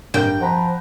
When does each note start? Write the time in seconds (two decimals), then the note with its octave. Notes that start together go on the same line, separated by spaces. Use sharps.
0.14 G2 A#4 G5 G6
0.40 F3 F#5 A#5 B5